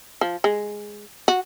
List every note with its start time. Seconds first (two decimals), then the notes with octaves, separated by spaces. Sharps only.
0.21 F3
0.44 G#3
1.28 F#4